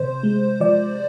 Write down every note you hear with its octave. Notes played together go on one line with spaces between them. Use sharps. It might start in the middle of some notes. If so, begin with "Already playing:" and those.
Already playing: C3 C5
G#3
F3 D5